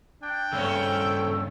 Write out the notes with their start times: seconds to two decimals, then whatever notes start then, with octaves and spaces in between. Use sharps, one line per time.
0.22 D4 G5
0.53 G2 C#3 A3 C4 C#4 E6